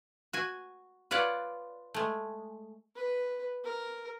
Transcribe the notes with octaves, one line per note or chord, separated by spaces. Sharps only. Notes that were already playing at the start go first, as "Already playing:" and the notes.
F#4 G#5
F4 B4 C#5 D5 F#5
G#3 A3
B4
A#4